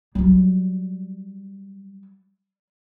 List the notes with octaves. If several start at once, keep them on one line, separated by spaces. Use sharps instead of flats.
F#3 G3